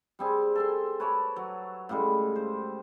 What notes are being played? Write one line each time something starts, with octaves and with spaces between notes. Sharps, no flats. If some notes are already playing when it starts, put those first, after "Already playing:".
G3 C4 G#4
A4 G#5 C6
B4 C#5 A5 D6
F#3
A2 C#3 G3 G#3
C5